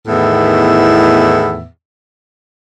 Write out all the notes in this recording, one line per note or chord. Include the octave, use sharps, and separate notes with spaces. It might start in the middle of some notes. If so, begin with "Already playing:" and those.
E2 A2 D#3 B3 E5